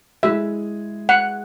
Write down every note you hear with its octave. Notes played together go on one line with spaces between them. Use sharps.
G#3 E4 G#4 E5
F#5